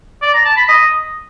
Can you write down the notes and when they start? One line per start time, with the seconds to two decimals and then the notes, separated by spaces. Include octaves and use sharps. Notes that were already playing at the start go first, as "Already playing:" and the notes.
0.22 D5
0.34 A#5
0.45 A5
0.57 B5
0.68 D#5